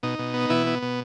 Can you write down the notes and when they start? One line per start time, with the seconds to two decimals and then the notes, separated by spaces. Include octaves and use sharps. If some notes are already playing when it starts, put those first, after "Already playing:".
0.03 B2 D#4
0.19 B2
0.34 B3
0.50 B2 E3 E4
0.67 B3
0.82 B2